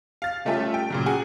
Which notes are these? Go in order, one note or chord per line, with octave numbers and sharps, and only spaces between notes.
F5 A6
G3 A3 C#4 F4 A4 E5
G5
A#2 C#3 F#3
F#4 G#4 F#5 G#5